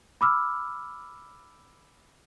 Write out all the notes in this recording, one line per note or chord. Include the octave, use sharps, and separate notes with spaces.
B5 D6 E6 F6